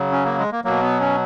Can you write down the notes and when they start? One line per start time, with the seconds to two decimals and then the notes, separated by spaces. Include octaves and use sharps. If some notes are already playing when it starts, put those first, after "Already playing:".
Already playing: C#3 F#3
0.12 C#4
0.25 A#3
0.38 G#3
0.52 A#3
0.64 B2 F#3 A#3
0.82 B3
1.00 C#4